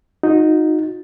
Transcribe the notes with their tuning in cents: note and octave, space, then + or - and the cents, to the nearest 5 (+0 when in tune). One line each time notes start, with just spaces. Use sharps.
D#4 +0 F#4 -40